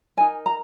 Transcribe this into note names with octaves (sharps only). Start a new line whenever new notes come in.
D#4 A#4 G#5
A#5